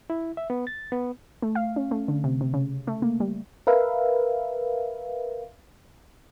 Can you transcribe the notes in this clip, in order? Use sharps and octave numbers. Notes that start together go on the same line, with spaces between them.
E4
E5
B3
A6
B3
A3
F5
C#4
A3
D3
C3
C3
C#3
A3
A#3
G3
A#4 B4 E5 F5